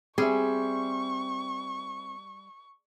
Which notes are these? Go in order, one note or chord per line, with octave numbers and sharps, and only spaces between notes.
G3 C4 G#4 E5 C#6